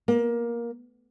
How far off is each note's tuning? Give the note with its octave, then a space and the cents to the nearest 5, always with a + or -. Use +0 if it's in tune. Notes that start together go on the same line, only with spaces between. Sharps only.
A#3 +15